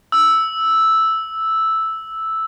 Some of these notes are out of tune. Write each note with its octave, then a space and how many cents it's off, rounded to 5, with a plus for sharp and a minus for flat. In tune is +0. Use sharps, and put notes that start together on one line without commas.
E6 -5